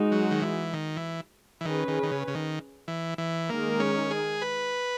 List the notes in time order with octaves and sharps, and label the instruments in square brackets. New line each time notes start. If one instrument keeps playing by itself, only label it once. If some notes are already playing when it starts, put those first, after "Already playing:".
Already playing: [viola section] G#3 D#4 F#4
[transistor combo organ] F#3
D#3
E3
D#3
E3
E3
[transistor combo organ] D#3 [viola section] C#4 G#4 B4
[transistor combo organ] D#3
D#3
C#3
C#3
D#3
E3
E3
[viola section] D#3 G#3 D#4 A#4 [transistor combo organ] A#3
[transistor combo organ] C#4
G#4
B4